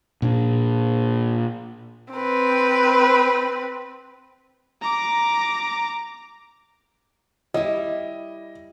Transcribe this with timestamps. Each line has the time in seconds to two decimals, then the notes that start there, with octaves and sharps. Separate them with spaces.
0.22 A#2 D4
2.13 C4 B4
4.82 A#5 D6
7.54 G3 E4 D#5